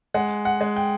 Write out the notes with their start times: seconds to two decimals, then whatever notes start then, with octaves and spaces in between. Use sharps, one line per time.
0.14 G#3 F#5
0.45 F#5
0.61 G#3
0.76 G5